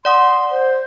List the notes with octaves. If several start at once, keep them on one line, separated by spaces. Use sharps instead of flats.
D5 F#5 C6 D#6
C5